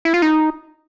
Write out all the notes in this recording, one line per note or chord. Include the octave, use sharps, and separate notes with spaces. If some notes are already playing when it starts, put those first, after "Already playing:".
E4
F4
D#4